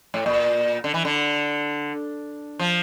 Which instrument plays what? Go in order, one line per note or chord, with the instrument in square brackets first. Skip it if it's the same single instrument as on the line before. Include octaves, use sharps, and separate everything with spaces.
[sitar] A2
A#2
D3
E3
D3
F3